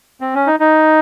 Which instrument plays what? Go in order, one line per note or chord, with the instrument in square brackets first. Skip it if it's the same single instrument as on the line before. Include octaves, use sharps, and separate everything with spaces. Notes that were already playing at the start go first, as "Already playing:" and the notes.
[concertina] C4
C#4
D#4
D#4